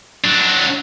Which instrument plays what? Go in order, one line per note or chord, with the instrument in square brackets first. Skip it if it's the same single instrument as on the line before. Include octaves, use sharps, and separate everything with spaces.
[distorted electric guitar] F#3 D4